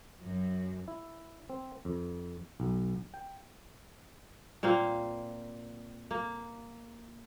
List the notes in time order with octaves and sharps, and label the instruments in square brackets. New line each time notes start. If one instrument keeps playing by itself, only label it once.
[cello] F#2 F#3
[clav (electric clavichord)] E4
C4
F2
B1
G5
[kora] A#2 A#3 C4 F5
A#3